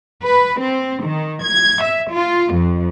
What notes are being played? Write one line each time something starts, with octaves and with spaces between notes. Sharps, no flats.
B4
C4
D#3
G#6
E5
F4
F2